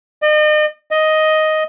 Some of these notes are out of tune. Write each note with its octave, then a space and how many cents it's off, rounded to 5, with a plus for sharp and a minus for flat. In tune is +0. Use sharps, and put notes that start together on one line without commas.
D#5 -40
D#5 +5